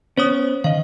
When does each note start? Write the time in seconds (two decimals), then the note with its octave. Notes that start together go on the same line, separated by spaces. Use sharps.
0.17 B3 C#4 C5 C#5 D#6
0.64 D#3 D#5 F5